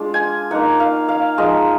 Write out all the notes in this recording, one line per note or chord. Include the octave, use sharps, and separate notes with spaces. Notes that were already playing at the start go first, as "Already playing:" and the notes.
Already playing: G#3 D4 F4
G#5
A#3 D#4 F#5
F5
F5
F3 G#3 D#4 D#5